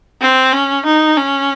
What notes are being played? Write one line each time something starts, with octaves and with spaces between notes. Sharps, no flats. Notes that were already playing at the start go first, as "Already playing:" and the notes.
C4
C#4
D#4
C#4